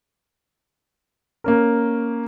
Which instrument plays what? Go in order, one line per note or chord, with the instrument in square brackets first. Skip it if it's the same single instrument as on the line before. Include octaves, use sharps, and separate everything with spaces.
[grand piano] A#3 C#4 A#4